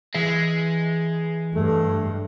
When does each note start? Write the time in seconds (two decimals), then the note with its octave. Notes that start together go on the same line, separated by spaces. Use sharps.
0.15 E3 G#3 E5
1.55 G2 A3